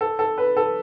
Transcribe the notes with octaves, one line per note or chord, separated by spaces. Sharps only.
A4
A4
B4
A4